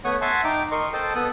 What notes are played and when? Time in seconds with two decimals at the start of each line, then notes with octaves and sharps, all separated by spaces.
0.05 A3 B3 C#5 F#5 C#6 D#6
0.22 E5 F#5 G#5 A5 C6
0.44 D#4 G5 A#5 D6
0.72 A#4 D#5 C6 C#6
0.93 A4 C5 D#5 G5 A5
1.15 B3 A4 D#6 F#6